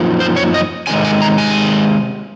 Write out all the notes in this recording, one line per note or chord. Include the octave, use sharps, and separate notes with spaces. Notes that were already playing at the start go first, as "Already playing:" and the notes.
Already playing: F#2 F3 A#3 D#4
C5
C#5
D#5
C3 D#3 G#3 G#5
G#5
A#5
G#5